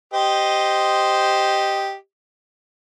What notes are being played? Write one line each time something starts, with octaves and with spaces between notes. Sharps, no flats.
G4 C5 D#5